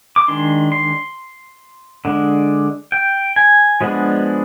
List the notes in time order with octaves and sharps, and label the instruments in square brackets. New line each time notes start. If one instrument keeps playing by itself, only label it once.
[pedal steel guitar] D6
D#3 G#3 D4 C6
C6
D3 G#3 D4
G5
G#5
F3 G#3 B3 D4